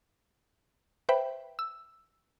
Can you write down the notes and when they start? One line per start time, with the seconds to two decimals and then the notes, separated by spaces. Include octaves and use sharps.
1.09 B4 C5 E5 G5 B5
1.59 E6